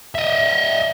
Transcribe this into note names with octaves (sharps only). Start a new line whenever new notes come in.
D#5 E5